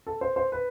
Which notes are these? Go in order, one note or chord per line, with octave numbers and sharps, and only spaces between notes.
A4
C5
C5
B4